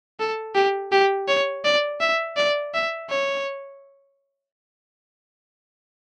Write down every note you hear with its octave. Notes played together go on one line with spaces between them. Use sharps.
A4
G4
G4
C#5
D5
E5
D5
E5
C#5